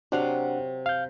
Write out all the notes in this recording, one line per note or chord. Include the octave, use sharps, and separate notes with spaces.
C3 F#3 D4 F5 F#5
F5 G6